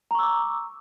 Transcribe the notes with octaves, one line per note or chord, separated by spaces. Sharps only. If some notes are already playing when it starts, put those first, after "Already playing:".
A#5 C#6 D6 E6